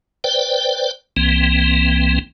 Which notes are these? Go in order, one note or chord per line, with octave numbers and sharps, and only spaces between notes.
B4 C5 D5 G5
C2 E3 A#3 C4